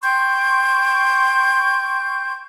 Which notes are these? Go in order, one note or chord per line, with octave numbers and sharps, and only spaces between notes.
G5 C6 C#6 G6